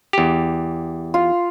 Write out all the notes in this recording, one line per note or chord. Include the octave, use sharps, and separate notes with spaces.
E2 G4
F4